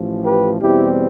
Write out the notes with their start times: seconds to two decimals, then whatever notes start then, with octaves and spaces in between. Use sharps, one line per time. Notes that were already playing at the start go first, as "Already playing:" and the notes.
Already playing: A1 A2 F3
0.24 G4 B4
0.61 E2 B2 G3 C4 E4 G4